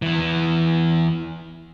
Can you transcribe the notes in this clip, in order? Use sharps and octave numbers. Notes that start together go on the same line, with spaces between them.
E2 E3